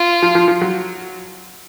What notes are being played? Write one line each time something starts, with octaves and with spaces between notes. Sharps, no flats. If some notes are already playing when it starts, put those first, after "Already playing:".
Already playing: F4
F3
F3
F3
F#3